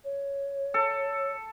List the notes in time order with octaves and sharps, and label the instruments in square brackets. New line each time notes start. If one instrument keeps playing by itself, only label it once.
[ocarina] C#5
[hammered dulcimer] A4